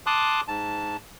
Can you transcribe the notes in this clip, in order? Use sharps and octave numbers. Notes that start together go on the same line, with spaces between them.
A5 C6 D6 D#6 F#6
G#2 A5